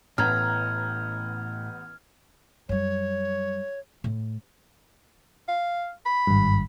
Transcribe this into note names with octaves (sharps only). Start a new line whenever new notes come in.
A1 A2 B3 A#5 F6 G#6
F#2 G3 C#5
A2
F5
B5
G#1 G2